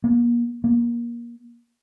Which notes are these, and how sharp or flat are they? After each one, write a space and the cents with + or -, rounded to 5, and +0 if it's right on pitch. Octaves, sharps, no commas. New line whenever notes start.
A#3 +35
A#3 +25